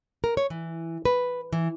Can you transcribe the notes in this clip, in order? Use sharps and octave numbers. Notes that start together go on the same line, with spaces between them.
A#4
C#5
E3
B4
E3